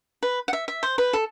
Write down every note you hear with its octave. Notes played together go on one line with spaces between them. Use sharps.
B4
F#5
E5
E5
C5
B4
A4